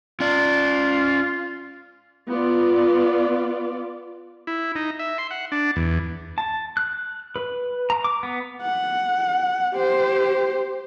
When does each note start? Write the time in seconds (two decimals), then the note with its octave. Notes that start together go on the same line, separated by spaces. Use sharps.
0.20 C#4 F4 D5
2.30 B3 F4 D5
4.47 E4
4.75 D#4
4.99 E5
5.18 C6
5.31 F#5
5.52 D4
5.76 E2
6.38 A5
6.77 F#6
7.36 B4
7.90 A#5
8.04 D6
8.23 B3
8.62 F#5
9.73 G4 C5